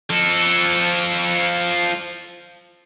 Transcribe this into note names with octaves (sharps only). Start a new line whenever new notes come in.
F3 A4